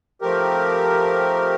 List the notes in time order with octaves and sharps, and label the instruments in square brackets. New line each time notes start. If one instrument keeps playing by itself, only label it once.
[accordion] F3 A3 C4 G4 A#4